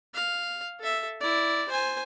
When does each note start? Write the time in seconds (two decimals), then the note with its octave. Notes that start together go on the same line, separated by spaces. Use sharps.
0.14 F5
0.80 A4 E5
1.20 E4 D5
1.69 C5 G#5